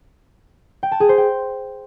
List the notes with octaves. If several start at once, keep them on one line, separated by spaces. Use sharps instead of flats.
G5
A5
G#4
C5
G5